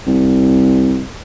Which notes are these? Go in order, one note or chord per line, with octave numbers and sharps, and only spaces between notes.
C2